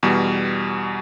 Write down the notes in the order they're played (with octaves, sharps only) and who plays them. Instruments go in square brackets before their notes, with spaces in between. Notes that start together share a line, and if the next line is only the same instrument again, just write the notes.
[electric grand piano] E2 B2 G3